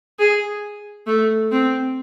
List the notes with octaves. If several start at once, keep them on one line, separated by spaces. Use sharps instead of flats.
G#4
A3
C4